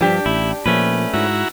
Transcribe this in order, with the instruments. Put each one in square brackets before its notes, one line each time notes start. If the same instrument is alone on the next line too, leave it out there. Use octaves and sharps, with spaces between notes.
[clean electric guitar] C#2 G2 [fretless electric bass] F3 [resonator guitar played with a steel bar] D4 G4
[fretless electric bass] A1 [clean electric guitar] E4
[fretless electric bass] A#2 F3 [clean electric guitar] A3 C#4 B4
[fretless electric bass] G#2 [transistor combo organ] E4 F#4 A#5